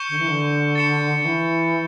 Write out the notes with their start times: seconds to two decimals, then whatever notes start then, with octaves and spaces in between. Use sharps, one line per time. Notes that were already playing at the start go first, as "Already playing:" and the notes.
Already playing: C#6 G6 C#7 E7 G7
0.09 D3
0.19 E3
0.28 D3
0.75 A6 C#7 E7
1.19 D3
1.25 E3